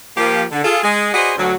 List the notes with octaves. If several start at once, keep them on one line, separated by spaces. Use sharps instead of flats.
F3 A#3 G4
D3
F4 G#4 A4
G#3 G#4
F#4 G#4 B4 C5 D5 D#5
D2 F#3